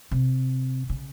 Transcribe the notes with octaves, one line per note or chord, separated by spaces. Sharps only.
C3
C#3